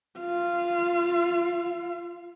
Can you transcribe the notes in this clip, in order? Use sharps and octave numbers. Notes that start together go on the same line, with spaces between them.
F4 F5